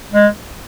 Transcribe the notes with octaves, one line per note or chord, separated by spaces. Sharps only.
G#3